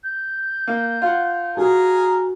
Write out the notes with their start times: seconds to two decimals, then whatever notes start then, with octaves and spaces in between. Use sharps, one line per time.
0.03 G6
0.68 A#3
1.02 F4 F#5
1.57 F#4 G#4 A#4